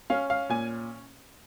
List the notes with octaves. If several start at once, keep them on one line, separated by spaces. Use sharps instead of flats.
C#4 F5
F5
A#2 G#5